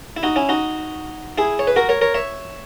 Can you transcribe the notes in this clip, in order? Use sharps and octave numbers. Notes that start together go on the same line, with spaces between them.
E4
D#4 F#4
C#4 E4
D#4 F#4
E4 G#4
C#5
B4
F#4 A#4
A#4 C#5
A#4 C#5
C#5 E5